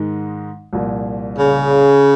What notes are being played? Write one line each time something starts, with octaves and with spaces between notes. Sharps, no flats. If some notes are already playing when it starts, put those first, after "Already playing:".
Already playing: G#2 D#3 G#3 D#4
C2 A#2 F3
C#3